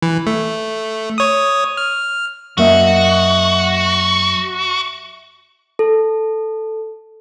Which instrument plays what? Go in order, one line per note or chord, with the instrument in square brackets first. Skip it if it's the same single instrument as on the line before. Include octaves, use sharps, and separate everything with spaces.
[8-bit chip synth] E3
A3
C#5 D#6
F6
[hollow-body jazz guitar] F#2 A#3 [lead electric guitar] F#4 [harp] D#5 E5 F#5
[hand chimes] A4